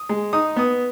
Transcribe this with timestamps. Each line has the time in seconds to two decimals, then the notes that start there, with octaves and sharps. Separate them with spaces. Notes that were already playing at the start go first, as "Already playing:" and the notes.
Already playing: D#6
0.09 G#3
0.33 D#4 D#6
0.56 B3 D#6